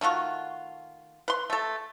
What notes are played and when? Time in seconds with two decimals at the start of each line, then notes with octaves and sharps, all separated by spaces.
0.01 D#3 A3 F4 F#4
1.28 B4 C6
1.50 A3 A4